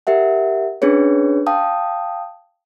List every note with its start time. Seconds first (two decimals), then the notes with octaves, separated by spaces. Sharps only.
0.07 G4 A#4 E5 F#5
0.82 C#4 D4 G#4 B4 C#5
1.47 F5 G5 A5 D#6